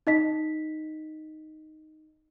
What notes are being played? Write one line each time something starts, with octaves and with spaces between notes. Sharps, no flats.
D#4 D#5 B6